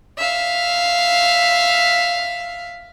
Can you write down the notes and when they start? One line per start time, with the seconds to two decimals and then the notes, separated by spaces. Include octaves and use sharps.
0.18 E5 F5